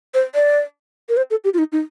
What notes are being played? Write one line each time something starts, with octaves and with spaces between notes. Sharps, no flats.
C5
D5
A#4
C5
A4
G4
F4
D#4
D#4